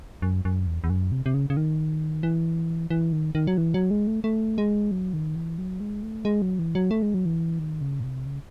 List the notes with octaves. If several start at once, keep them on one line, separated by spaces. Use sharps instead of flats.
F#2
F#2
E2
E2
F#2
C3
C3
C#3
C#3
D#3
E3
E3
D#3
D#3
F#3
E3
F#3
G#3
A3
A3
G#3
F#3
D#3
E3
F#3
G#3
A3
G#3
F#3
E3
F#3
A3
G#3
F#3
E3
D#3
C#3
A2
C3
C#3